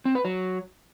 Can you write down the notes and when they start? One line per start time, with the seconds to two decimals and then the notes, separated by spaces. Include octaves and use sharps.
0.05 C4
0.15 B4
0.25 F#3